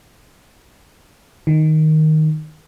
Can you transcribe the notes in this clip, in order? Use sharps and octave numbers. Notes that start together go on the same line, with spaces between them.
D#3